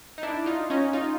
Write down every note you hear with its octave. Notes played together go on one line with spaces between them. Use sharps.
D#4
D4 E4
D#4 F4
C#4 D#4
D#4 F4